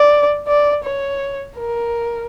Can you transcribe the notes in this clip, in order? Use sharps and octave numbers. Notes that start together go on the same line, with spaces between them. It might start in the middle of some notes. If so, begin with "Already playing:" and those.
Already playing: D5
D5
C#5
A#4